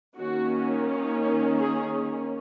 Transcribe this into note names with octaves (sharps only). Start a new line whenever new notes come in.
D#3 A#3 C#4 F#4
G#4